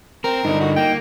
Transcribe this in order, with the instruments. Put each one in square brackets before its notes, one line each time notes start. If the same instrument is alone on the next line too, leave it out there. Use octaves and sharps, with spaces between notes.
[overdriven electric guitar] C4 [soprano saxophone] A#4
[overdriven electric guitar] G2 D3 [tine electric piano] D#4 D#5
[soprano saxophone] F#4
[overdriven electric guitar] A#3 [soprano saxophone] G5